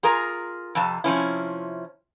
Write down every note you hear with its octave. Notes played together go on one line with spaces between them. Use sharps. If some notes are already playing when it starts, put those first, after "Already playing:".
F4 G#4 A#4 A#5
F2 C3 A5
C3 F3 C#4 E4